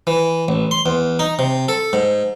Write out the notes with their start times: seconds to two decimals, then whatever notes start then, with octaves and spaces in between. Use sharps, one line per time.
0.07 E3
0.48 A1
0.71 C6
0.86 E2
1.19 D#4
1.39 C3
1.69 A4
1.93 G#2